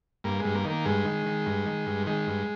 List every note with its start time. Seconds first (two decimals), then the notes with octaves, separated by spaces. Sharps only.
0.24 G2 A#3
0.39 G#3
0.45 G2
0.55 A#3
0.65 D#3 A#3
0.86 G2 G#3
1.05 D#3
1.26 D#3
1.46 G2
1.66 D#3
1.86 G2
2.06 D#3 G#3
2.27 G2